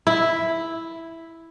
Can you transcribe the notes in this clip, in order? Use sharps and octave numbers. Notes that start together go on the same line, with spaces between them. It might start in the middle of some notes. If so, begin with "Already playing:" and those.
E4